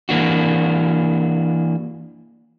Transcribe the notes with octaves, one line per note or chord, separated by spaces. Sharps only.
E3 A#3 D4 F#4